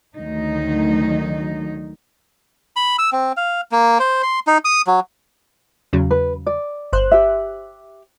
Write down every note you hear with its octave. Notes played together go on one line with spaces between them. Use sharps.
D2 D#3 F#3 D#4
B5
E6
C4
F5
A#3
C5
C6
D#4
D#6
F#3
E2 C#3 F#3
B4
D5
G1 C5 F#6
G4 E5